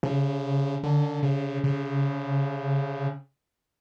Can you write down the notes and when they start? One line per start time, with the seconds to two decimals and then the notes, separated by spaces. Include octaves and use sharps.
0.03 C#3
0.83 D3
1.23 C#3
1.64 C#3